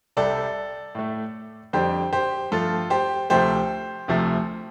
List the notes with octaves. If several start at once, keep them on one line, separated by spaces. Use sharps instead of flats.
C2 C3 G3 A4 D5
A2 A3
F2 D3 G3 G4 C5
G4 C5
G2 F3 A3 F4 A4
G4 C5
D2 C3 F3 A3 G4 C5
D2 C3 F3 A3